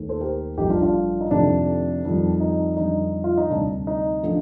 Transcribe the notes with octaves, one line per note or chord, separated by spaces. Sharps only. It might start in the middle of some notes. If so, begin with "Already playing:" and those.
Already playing: D#2 D#3 A3
A4 C5
G4 A#4
A1 G2 F3 A3 D#4 G4
D4 F4
D4 F4
D#4
F2 C3 D#3 A3 D4
F2 D#3 G3
D#4
F2 D3 G3 D#4
F4
D#4
D2 C3 G3 D4
D#4
D3 F3 A3